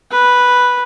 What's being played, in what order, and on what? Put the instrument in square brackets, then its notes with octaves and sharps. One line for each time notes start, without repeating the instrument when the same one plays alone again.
[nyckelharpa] B4